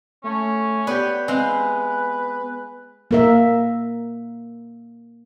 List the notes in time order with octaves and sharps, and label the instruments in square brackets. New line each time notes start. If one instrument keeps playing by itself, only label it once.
[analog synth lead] A3 [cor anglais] C#4
[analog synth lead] B3 [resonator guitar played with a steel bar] G4 C#5 D5 [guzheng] B4
[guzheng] G#3 F5 [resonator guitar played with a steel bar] C4 [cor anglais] B4
[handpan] A#3 A#4 E5